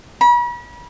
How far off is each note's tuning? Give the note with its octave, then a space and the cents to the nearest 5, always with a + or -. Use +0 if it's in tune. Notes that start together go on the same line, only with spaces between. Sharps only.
B5 -40